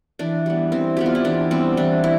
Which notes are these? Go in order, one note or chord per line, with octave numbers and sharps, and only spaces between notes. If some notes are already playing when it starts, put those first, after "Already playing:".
E3 D4
G3 B3
E3 C4
G3 B3 G4
F4
E4
E3 D4
G3 B3 C4
E3 D4
E4